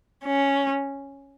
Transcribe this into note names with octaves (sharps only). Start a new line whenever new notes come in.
C#4